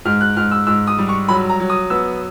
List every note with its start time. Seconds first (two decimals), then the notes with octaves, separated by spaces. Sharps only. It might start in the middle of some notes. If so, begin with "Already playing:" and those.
0.05 G#2 F6
0.21 F#6
0.36 G#2 F6
0.51 E6
0.67 G#2 E6
0.87 D#6
0.99 G3
1.08 C#6
1.28 F#3 B5
1.50 A#5
1.60 F#3
1.70 D#6
1.90 B3 E6